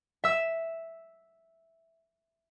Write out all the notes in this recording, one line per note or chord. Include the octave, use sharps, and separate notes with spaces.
E5 E6